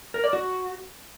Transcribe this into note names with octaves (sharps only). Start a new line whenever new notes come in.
A#4
D5
F#4